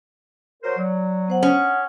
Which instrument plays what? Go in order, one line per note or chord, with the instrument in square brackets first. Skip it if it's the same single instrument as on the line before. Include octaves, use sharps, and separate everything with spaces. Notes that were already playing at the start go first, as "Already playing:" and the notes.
[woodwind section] F#3 A#4 C5
[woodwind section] F#3 [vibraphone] D5
[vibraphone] B3 C5 F#5
[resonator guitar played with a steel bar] C#4 [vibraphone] F#5 D#6